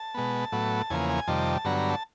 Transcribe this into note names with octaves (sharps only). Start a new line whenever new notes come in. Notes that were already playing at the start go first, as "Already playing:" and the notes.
Already playing: A5
B2 G#3 B3
A2 F#3 B3
E2 C#3 F3 A#3 G#5
G#5
F2 C3 D#3 G3 A5
G2 D3 F#3 B3 A#5
A#5
A5